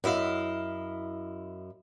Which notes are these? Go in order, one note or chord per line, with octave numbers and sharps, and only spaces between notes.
F#2 E4 D#5 F5